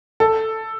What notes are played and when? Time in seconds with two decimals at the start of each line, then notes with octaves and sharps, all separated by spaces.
0.20 A4